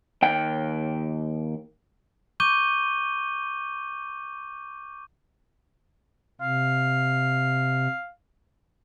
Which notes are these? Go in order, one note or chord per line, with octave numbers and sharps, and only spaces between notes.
D#2 G5
C#6 D6 G6 D#7 G7
C3 F5